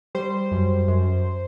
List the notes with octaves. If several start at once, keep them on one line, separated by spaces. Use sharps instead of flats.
G3 C5
F#2
F#2